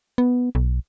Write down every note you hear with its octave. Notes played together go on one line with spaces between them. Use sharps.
B3
B1